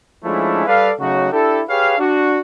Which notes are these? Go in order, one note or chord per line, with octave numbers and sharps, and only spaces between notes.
F3 G#3 A3 C#4 D4 E4
G3 A4 B4 D5 F5
C#3 F#3 A3 D#4 F#4
D4 E4 G4 A4
G4 G#4 B4 C#5 F5
D4 F#4